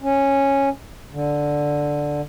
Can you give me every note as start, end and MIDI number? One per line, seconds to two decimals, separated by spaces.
0.01 0.69 61
1.12 2.21 50